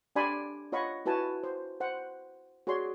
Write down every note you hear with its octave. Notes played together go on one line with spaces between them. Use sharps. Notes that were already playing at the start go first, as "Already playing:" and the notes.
D4 G4 D5 G#5 B5 C6
F4 C#5 D#5 F#5 B5 C#6
E4 F#4 B4 G#5 A5
C5
C5 F#5
F#4 G#4 C#5 D5 C6